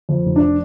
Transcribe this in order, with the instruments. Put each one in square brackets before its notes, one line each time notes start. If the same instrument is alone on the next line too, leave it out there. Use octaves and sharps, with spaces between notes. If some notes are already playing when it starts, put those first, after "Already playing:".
[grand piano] F2
F1
D4